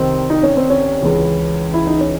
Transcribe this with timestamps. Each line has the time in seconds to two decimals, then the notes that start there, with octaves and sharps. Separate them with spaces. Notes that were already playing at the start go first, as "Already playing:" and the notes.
Already playing: C2 C3 D#3 C4
0.30 D#4
0.43 C#4
0.57 C4
0.70 C#4
1.02 C#2 C#3 E3
1.74 E4
1.87 D#4
2.00 C#4